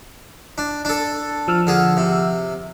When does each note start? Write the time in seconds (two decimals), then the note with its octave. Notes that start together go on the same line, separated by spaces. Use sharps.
0.58 D4
0.85 D4 A4
1.48 F3 E6 F6
1.67 D3 G#4
1.97 C3